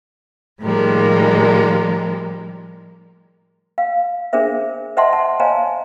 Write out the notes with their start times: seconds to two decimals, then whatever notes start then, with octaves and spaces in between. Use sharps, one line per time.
0.61 A2 D#3 F3 G3 G#3 A#3
3.78 F5
4.33 D4 G#4 A#4 C5 E5
4.97 C5 D#5 E5 F#5 A5 C6
5.13 A5
5.40 C5 C#5 D#5 F5 G#5 A#5